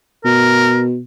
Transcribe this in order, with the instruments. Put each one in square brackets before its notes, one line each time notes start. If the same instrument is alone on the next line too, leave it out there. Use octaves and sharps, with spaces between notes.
[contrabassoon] B2 [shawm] A#4